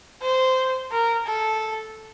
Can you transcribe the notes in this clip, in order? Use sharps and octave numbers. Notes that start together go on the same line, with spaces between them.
C5
A#4
A4